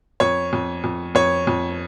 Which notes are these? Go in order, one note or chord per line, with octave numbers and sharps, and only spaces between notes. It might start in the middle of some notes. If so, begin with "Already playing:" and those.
F2 C#5
F2
F2
F2 C#5
F2